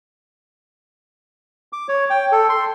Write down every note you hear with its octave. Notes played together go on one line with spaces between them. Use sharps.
D6
C#5
G5
A4
C6